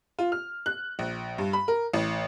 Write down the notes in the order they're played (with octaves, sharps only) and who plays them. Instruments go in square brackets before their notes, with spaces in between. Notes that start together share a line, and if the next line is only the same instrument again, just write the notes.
[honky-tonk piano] F4
F6
F#6
A#1
G2
B5
A#4
A1